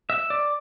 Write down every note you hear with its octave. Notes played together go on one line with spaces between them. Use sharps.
E5
D5